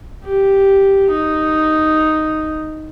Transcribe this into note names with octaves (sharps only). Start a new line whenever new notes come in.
G4
D#4